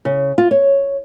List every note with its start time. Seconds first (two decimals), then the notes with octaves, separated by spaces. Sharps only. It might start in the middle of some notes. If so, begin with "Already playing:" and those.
0.05 C#3
0.38 F4
0.51 C#5